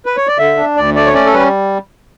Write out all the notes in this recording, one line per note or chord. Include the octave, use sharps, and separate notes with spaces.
B4
C#5
D5
D3 E5
D4
D2 D5
A3 D5
C#5
C#4 D5
A4
G3 B4